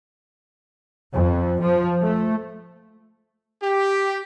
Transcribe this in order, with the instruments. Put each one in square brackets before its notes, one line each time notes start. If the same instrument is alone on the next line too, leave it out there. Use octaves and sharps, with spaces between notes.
[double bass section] F2
F3
A3
[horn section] G4